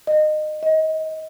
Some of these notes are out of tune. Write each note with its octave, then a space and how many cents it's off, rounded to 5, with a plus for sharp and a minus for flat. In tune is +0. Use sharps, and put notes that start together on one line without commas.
D#5 -25
D#5 +25